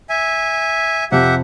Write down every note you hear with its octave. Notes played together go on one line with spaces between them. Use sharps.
E5 G#5
F2 C3 G4 E5 F#5